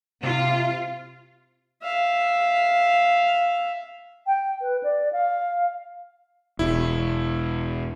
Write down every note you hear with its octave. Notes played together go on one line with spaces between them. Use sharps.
C3 F4
E5 F5
G5
B4
D5
F5
E1 E4